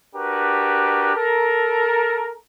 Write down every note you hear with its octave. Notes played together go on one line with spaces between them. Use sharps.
D4 F#4 G4 A#4 B4
A4 A#4